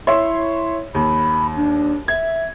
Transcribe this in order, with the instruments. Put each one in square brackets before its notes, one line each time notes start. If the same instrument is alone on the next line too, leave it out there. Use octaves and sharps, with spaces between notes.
[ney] E4 [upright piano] C#5 E5 C6
[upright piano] D#2 [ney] B5
[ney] D4
[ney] E5 [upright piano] G#6